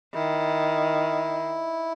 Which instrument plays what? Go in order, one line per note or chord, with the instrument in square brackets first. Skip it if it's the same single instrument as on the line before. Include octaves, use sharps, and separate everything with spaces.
[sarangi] D#3 [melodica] E4